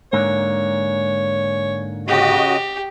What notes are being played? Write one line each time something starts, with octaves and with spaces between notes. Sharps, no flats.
G#2 D3 A#3 C#5
C#3 F#4 G4 D#5